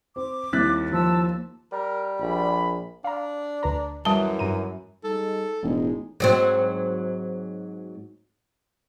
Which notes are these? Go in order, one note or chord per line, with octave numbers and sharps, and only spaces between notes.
C4 D6
D#2 G3 C4 E4 F#6 A6 B6
F3 A5 E6
G3 A#4
A#1 B5
D4 F5 A#5
D2 B4 A#5
F#2 E3 G3 A5
G2 A#5 D#7
G3 G#3 D#4 A4
E1 A2 G#3 D#4
G#2 F#3 C4